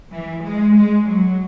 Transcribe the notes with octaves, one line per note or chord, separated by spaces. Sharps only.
E3
G#3
G#3
F#3